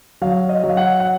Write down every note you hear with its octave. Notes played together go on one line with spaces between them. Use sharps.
F#3 F5
D#5
F#3
F5
F#5
F#5